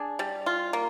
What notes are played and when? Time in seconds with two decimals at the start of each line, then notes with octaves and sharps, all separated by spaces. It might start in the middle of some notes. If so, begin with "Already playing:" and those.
Already playing: D4 G#4
0.19 G3
0.46 F4
0.73 A#3